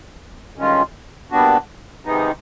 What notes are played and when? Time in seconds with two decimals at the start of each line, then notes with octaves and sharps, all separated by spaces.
0.56 G2 D#3 G#3 C#4 F4
1.31 A#2 G3 B3 D4 F#4
2.05 C3 D#3 G#3 B3 D#4